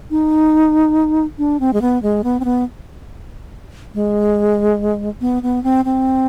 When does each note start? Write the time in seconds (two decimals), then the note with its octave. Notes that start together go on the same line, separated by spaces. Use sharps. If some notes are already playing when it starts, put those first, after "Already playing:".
0.11 D#4
1.38 D4
1.60 C4
1.73 G#3
1.82 B3
2.03 G#3
2.24 B3
2.40 C4
2.45 B3
3.94 G#3
5.21 B3
5.43 B3
5.64 C4
5.85 C4